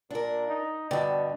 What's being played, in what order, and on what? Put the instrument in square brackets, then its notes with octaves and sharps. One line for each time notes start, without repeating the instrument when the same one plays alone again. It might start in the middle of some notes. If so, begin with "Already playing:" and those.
[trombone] A#2 [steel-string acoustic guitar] D4 A#4
[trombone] D#4
[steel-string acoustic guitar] G2 D3 [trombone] B2 [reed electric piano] D5 D#5 G5